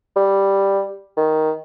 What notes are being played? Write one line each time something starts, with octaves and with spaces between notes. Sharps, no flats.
G3
D#3